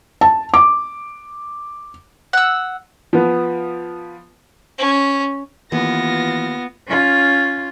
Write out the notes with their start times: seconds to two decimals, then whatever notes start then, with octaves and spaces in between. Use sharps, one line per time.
0.21 A5
0.54 D6
2.33 F#5 E6
3.13 F3 B3
4.78 C#4
5.72 D#2 E3 B3 F4 A#6
6.88 C#4 F4